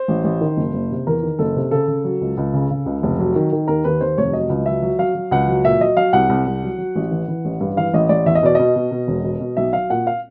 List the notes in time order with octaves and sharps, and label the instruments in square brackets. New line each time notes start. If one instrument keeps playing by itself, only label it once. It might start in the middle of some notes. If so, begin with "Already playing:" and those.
Already playing: [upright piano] C5
A1
A1
D#3
F#1
F#1
C3
E2 A#4
D#3
F#1 A4
C3
C#3 A4
C#3
F#3
C#2
C#2
C#3
C#3
C#2
F1
F#3
D#3
D#3
D#2 A#4
D#2 B4
D#2 C5
F1 C#5
F#3 D#5
C#2
F#3 E5
F#3
F#3 F5
F#3
C#2 F#5
F#3
A#2 E5
F#3 D#5
F#3 F5
C2 F#5
C2
C2
F#3
F#3
A1
E3
E3
A1
G2
E3 F5
A1 D#5
A1 D5
E2 E5
D#5
B2 D5
B2 D#5
B2
B2
E1
B2
B2
B1 E5
F#3 F5
A#2 F#5
F5